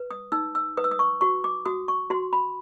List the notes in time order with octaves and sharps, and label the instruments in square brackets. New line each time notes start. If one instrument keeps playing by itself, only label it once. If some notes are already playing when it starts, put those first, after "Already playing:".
Already playing: [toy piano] B4
D#6
D#4 E6
E6
B4 D#6
E6
D#6
C#6
F#4 C#6
D6
F#4 D#6
C#6
F#4 C6
B5